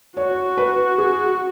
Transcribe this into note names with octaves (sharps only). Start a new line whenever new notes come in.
F#4 C#5
B4
G#4